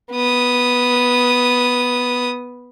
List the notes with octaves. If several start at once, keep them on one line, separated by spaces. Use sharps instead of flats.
B3 D#6